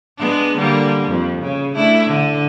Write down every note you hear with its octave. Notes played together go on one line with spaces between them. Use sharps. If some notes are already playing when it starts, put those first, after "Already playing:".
G#3 B3 D4
D3 G3 A#3
F2
C#3
A3 D4 E4
D3